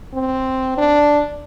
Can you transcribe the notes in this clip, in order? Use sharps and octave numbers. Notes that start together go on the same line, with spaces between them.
C4
D4